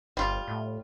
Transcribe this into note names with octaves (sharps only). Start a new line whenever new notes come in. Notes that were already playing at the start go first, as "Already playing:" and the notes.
G1 G3 F4
A2